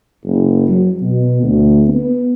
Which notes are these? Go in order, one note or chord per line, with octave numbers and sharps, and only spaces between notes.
F#1
F#3
B2
D2
B3